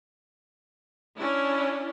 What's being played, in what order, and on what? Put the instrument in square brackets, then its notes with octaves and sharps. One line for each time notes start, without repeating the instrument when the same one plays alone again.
[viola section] C#4 D4 E4